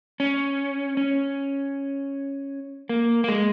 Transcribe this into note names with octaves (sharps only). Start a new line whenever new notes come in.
C#4
C#4
A#3
A#3
G#3